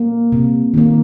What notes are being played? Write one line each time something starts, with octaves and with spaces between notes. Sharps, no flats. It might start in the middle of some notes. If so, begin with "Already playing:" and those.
Already playing: A#3
C3
D#3 A#3